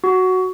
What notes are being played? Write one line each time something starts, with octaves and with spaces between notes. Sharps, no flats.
F#4